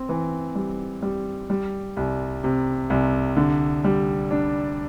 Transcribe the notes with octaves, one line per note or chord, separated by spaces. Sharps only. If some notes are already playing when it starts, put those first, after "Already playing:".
Already playing: C4
E3
G3
G3
G3
C2
C3
C2
D3
G3
D4